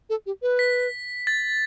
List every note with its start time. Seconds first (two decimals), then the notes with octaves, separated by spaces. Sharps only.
0.10 A4
0.26 G4
0.42 B4
0.59 B6
1.27 A6